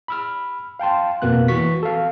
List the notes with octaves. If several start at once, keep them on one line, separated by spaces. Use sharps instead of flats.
B5 E6 F6
F5 G5 A5 C6
F2 B2 A#3 B3 F#6
E3 F#4 C#6 B6
A4 F5